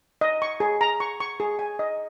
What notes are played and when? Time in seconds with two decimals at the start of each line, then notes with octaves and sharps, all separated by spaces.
0.21 D#5
0.42 C#6
0.60 G#4
0.81 A#5
1.00 C#6
1.20 C#6
1.40 G#4
1.59 G#5
1.79 D#5